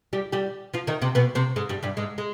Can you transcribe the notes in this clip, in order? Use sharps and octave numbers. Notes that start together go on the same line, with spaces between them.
G3 G4
G3 G4
F3 F4
D#3 D#4
C3 C4
B2 B3
C3 C4
G#2 G#3
G2 G3
G2 G3
G#2 G#3
G#3